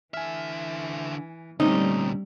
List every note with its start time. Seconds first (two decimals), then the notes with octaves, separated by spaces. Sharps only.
0.14 D3 E3 E5 G#5 F6
1.60 D2 A#2 G3 A3 C4 C#4 D#4